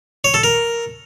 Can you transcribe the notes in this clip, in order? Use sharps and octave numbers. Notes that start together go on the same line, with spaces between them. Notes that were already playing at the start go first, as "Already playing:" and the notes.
C#5
A4
A#4